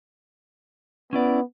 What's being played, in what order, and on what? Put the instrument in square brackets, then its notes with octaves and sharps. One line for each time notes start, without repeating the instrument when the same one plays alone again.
[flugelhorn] B3 [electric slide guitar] C#4 E4 D5